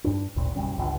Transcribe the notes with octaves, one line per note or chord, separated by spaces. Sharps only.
G2 D4
G#1 D2 A#2
F#1 B1 G3 C#4
G1 C#2